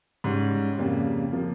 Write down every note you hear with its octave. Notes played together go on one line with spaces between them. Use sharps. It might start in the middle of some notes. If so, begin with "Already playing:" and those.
G#2 G3 C#4
F2 C#3 G3 A#3
C3 F3 A#3